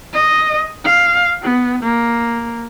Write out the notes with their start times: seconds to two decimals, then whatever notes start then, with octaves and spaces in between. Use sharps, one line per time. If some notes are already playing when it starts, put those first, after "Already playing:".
0.13 D#5
0.85 F5
1.42 B3
1.83 A#3